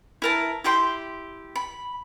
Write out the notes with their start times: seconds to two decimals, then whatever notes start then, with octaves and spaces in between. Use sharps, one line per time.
0.22 E4 A#4 A5
0.64 E4 G4 G5 C6
1.56 B5